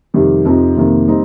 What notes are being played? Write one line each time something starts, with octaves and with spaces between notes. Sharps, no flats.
F2 C3 D#3 G3
F2 C3 F3 D#4
F2 C3 D#3 A#3
G3 C4 D#4